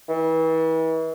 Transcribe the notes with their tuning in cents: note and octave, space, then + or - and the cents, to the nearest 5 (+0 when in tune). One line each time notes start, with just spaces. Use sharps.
E3 -35